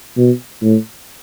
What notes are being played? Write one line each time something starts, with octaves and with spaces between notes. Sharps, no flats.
B2
A2